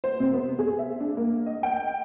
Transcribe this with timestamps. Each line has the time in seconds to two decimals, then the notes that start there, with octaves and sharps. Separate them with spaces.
0.04 C5
0.20 C3
0.33 B3
0.59 G#4
0.79 E5
1.00 D4
1.17 A#3
1.46 D#5
1.63 G5